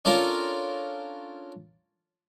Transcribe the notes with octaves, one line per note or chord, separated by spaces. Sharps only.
C#4 D4 F4 A4 A#4